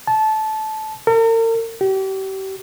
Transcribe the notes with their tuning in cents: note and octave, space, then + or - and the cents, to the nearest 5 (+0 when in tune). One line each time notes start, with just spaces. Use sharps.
A5 -15
A#4 -45
G4 -35